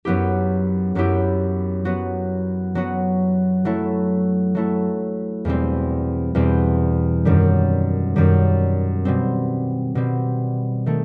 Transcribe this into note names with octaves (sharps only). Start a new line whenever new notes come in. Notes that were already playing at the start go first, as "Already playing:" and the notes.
F#2 F#3 B3 E4 G4
F#2 F#3 B3 E4 G4
F#3 B3 F#4
F#3 B3 F#4
F#3 A3 E4
F#3 A3 E4
E2 B2 G3 C4
E2 B2 G3 C4
F#2 D#3 G3
F#2 D#3 G3
B2 G3 C4
B2 G3 C4
D#3 A3